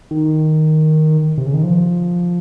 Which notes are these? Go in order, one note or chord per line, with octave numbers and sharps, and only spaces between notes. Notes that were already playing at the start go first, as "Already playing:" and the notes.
D#3
C3
C#3
D#3
F3